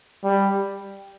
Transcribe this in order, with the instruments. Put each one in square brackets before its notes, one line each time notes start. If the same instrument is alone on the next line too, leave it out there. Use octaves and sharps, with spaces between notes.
[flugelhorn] G3